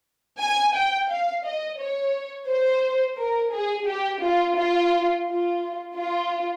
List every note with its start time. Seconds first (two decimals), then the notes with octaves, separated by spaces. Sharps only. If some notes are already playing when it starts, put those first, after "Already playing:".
0.40 G#5
0.75 G5
1.10 F5
1.45 D#5
1.80 C#5
2.49 C5
3.18 A#4
3.52 G#4
3.87 G4
4.23 F4
4.57 F4
5.27 F4
5.95 F4